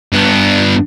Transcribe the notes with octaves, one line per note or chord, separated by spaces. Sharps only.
G2 B3